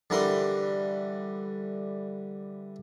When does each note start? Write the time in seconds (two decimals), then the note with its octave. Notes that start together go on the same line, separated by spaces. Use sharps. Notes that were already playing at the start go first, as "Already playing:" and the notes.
0.10 D3 E3 G3 A#4 C6